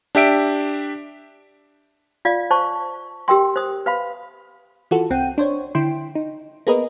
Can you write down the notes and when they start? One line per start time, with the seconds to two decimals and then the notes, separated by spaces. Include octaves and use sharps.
0.15 D4 G4 E5 D7
2.25 F4 D5 F5
2.51 C5 A5 C#6
3.28 G4 A#4 G5 C6
3.56 C5 D#6
3.86 B4 F5 B5
4.91 E3 F4 F#4 A4
5.10 C2 C4 F#5 G5 D#7
5.38 D4 C5 C#5
5.75 D3 E4 G5 C6 D7
6.15 D#4
6.67 A#3 B3 G#4 A#4 B4 D#5